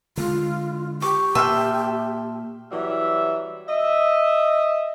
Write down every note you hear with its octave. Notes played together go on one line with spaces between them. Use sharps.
D3 G#3 F4
G4 C#6 D6
A#2 E5 G5 A5 C6 F6
E3 F#3 G3 E5
D#5 E5